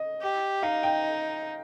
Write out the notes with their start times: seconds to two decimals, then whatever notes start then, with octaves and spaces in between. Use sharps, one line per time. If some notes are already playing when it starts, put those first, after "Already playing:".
Already playing: D#5
0.22 G4
0.62 D#4 F5
0.83 G5